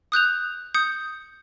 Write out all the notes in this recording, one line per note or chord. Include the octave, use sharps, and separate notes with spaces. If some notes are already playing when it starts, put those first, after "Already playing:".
D#6 F#6 G6 F7
D#6 G6 C#7